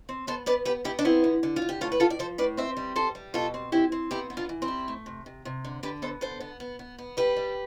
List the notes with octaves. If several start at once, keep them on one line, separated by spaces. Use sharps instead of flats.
C4
B3 A4 C5
B3 B4 D5
B3 G4 B4
B3 E4 G4
D4
B3 C4 E4
D3
D3
F4
D3
G4
A2 F4 A4
B4
A2 F4 A4
D5
F3 A4 C5
A2 B4 D5
C4 C5 E5
G3
G3 A4 C5
G3
B2 F4 A4
C4
C4 E4 G4
C4
B3 E4 G4
B3
D4 F4
E3
C4 E4
G3
A3
C3
C3
C3
D3
D3 G4 B4
B3 A4 C5
D3 A4 C5
B3
B3
B3
B3
G3 G4 B4
G3